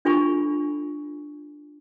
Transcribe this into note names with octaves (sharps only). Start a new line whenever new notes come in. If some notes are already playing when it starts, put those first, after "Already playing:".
D4 F4 A4 G#5 B5 C#6